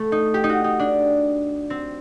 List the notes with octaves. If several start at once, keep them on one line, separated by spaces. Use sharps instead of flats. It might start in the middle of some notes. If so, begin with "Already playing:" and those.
Already playing: A3
D#4
G4
D#4
F#4
D#4
D4
C4